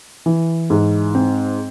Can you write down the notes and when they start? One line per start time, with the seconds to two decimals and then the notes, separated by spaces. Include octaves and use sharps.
0.26 E3
0.70 G#2
1.15 C4